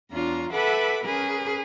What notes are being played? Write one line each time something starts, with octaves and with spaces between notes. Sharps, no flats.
E2 D4 F4 C#5 A#5 C6
A4 B4 E5 F#5 B5 D6
C#4 G#4 A#4 B4